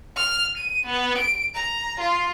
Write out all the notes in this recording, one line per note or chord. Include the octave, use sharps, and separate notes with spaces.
F6
D#7
B3
D7
A#5
F4